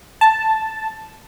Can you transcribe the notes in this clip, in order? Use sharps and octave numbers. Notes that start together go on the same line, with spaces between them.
A5